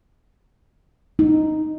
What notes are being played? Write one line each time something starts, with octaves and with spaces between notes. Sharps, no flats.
D#4